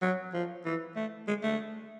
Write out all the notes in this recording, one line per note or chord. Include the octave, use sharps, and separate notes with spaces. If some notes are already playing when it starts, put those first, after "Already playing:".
F#3
F3
E3
A3
G#3
A3